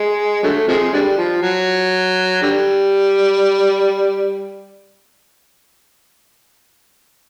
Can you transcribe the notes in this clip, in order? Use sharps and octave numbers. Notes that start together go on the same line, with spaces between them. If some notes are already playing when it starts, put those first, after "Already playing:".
Already playing: G#3
D3 F#3 A3
C3 F3 G#3
D3 G3
F3
F#3
D3 G3